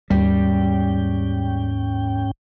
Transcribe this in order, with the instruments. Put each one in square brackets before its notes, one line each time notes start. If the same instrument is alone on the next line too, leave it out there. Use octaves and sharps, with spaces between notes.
[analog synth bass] D#2 [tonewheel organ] G#2 C#4 G5 [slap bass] G3